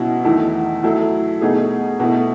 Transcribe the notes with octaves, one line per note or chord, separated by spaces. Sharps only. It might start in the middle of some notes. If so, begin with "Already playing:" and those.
Already playing: B2 F#3 C#4 E4
E2 D#3 A3 E4 A4
F#3 A3 E4 A4
B2 A3 D#4 G#4
B2 A3 E4